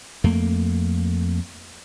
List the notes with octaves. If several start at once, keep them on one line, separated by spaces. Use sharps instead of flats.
F2 A3 A#3